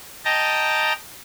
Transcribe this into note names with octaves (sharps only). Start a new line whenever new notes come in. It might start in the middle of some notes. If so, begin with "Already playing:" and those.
D#5 G5 A5 A#5